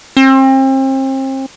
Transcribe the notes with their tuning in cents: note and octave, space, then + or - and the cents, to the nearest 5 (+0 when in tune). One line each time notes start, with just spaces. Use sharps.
C4 +35